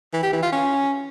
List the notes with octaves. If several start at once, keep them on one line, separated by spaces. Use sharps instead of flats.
E3
G4
E3
F4
C#4